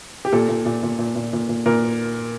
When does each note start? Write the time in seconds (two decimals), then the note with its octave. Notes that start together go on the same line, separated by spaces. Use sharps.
0.25 G4
0.32 A#2 A4
0.49 A#2
0.66 A#2
0.83 A#2
0.98 A#2
1.15 A#2
1.33 A#2
1.49 A#2
1.66 A#2 A#4